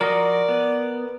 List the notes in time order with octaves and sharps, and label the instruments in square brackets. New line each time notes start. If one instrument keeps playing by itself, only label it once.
[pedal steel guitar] F3 F#4 D#5 [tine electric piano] A#4 [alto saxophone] D5
[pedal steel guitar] B3